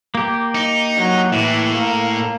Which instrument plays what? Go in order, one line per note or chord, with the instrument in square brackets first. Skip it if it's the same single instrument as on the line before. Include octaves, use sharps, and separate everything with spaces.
[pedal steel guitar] A#3 G4
[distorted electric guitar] D#4
[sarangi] F#3
[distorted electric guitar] A2 [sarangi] E3
[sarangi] A#3